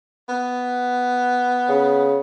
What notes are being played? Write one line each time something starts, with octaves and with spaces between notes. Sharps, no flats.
B3
C#3